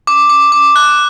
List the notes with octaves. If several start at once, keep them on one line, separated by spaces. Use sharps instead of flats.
D6
D6
D6
F#6